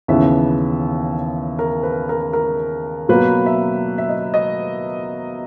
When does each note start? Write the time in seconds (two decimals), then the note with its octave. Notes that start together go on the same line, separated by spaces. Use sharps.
0.08 D#2 C#3 E3 B3 E5
1.59 A#4
1.83 B4
2.09 A#4
2.33 A#4
3.08 B2 F#3 A#3 B4
3.46 E5
3.98 E5
4.09 D#5
4.34 D#5